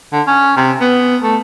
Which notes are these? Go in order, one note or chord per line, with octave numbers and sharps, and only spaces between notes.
D3
C#4
C3
B3
A3